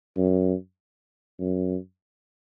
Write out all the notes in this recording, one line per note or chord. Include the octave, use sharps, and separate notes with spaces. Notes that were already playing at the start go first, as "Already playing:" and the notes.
F#2
F#2